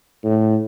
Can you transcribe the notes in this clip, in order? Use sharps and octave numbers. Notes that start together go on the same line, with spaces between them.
A2